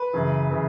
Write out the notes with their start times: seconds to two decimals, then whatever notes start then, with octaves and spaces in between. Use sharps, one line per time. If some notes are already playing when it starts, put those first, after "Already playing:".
Already playing: B4
0.13 F#2 C#3 E3
0.50 C#3 E3